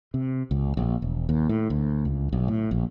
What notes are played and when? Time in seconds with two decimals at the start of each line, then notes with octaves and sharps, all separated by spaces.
0.14 C3
0.51 C#2
0.77 A#1
1.02 E1
1.29 D#2
1.49 A2
1.70 D2
2.05 C#2
2.33 B1
2.48 A2
2.71 A#1